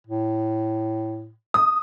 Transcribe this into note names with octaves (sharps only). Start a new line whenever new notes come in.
A2
D#6